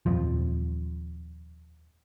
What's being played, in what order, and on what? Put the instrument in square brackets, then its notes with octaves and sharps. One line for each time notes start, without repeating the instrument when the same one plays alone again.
[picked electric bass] D#1 F2 F3